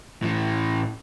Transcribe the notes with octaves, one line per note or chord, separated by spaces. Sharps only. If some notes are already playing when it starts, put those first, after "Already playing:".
A2 E3